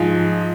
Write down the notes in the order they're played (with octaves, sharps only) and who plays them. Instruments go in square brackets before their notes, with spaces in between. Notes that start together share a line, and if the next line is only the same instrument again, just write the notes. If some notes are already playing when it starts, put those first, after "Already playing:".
Already playing: [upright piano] G#2 F3 G#3